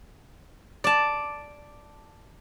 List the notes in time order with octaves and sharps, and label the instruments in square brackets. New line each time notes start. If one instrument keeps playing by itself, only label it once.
[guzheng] D5 A5